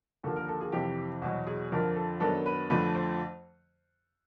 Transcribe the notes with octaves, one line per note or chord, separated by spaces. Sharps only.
D#2 D3 F3 A#3 A4
A#4
A4
G#4
F2 C3 E3 G4
E2 B2 F#3 F#4
G#4
F2 D3 F3 A#4
A4
F#2 D#3 F#3 B3 D4 A4
B4
F2 D3 F3 A3 B4
C5